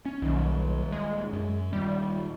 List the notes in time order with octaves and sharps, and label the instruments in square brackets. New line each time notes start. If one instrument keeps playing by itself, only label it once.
[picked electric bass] C#4
[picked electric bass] D#1 D#3 [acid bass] B1
[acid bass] G#3
[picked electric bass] F#2
[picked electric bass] D#1 [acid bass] G3